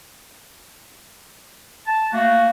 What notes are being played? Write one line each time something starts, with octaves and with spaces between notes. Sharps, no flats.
A5
A3 A#3 F#4